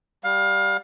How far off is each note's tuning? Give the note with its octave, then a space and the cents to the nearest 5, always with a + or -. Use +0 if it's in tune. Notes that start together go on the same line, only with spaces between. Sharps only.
G3 +0 F5 +25